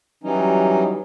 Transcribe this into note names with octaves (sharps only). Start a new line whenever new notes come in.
E3 F#3 G3 C#4 D#4